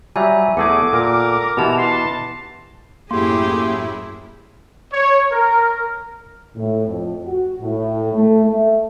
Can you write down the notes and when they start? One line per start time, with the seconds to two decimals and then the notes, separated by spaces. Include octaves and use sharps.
0.16 F#3 G3 E5 G#5
0.57 E2 A3 G#4 A4 F#5 D6
0.93 A#2 A#4
1.57 B2 E3 B3 G4 A5 F7
1.78 E4 A5 C6
3.11 F#2 A2 A#3 E4 G4 G#4 C6
4.93 C#5
5.32 A#4
6.56 A2
6.87 F2
7.26 F#4
7.61 A2
8.14 A3
8.46 A3